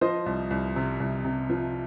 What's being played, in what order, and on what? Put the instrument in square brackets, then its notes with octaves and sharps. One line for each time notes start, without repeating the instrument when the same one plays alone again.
[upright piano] F3 C5 D#5
C2
C2
C3
C2
C3
F3